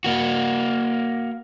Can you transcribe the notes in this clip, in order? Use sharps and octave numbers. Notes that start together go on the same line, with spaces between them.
A#3 F#4